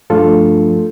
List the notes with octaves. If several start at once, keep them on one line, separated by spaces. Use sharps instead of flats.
G2 F3 A3 D4 F4 A4